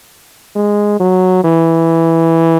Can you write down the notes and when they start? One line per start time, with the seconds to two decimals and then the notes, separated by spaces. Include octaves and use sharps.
0.56 G#3
1.00 F#3
1.44 E3